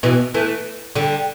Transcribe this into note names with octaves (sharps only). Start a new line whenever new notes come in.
B2 E3
E3 A3
D3 G3